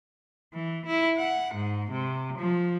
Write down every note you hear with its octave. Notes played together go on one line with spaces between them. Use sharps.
E3
E4
F#5
G#2
C3
F3